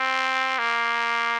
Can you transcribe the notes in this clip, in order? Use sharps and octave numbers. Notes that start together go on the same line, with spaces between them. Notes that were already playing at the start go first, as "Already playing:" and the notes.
Already playing: C4
A#3